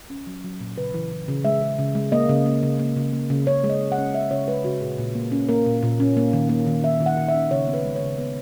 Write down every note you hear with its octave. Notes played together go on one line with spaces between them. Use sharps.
C#4
F#3
F#3
A#2
C#3 B4
E3
E3
C#3
G#3 E5
G#3
C#3
G#3
A#3 D#5
C#3
A#3
C#3
A#3
C#3
A#3
C#3
C#3 C#5
G#3
D#5
C#4
F#5
C#4
C#4 E5
C#3 C#5
G#3 B4
C#3 F#4
A#2 G#4
A#2
A#3
C#4
A#3 A#4
A#2
A#2
C#4
A#3
D#3
A#3
D#3
D#3 E5
D#3
F#5
D#3
E5
C#4
C#3 C#5
B3
B4
G#3
C#5
C#3
B3 B4